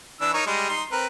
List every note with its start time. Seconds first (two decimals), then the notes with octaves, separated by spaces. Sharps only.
0.21 E3 D4 E6
0.34 D#4 A#4 C#5
0.47 G3 G#3 D#5
0.69 D#4 C6
0.92 C4 A#4 B4